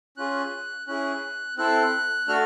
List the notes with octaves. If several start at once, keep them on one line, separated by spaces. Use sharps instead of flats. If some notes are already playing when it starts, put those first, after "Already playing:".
C#4 F4 G#4 F#6
C#4 E4 G#4 F#6
C4 E4 A4 F#6
A3 D4 F#4 A4 F6